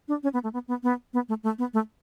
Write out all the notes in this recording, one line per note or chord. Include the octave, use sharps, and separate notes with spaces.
D4
C#4
B3
A3
B3
B3
B3
B3
A3
A3
B3
A3